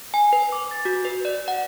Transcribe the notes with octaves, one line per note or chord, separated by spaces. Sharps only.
G#5
B4
D6
A6
F#4
B4
D5
F#5